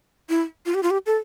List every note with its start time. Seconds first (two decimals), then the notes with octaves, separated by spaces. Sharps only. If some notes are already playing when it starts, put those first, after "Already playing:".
0.29 E4
0.66 F4
0.74 G4
0.83 F4
0.91 G4
1.06 A4